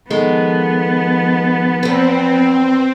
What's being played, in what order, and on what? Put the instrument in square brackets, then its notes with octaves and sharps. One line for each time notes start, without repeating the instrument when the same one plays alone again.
[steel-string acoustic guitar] D#3 G#3 A4 [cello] F3 B3
[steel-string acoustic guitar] E2 B4 [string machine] C4